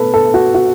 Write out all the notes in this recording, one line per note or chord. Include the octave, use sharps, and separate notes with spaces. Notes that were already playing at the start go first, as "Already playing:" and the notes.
Already playing: B2 A3 A4 B4
A4
F#4
F#4